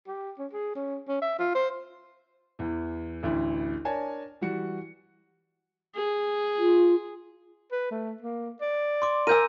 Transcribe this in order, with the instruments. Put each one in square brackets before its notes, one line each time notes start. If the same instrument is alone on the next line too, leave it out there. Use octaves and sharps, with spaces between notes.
[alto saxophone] G4
C#4
G#4
C#4
C#4
E5
F4
C5
[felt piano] E2 E3
A1 D2 E3 E4
D4 A#4 C#5 D5 G#5 A5
E3 G3 F#4 C#7
[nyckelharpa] G#4
[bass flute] F4
[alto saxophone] B4
A3
A#3
D5
[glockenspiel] C6 D6
[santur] A#4 G#5 [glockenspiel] E6 G6 D#7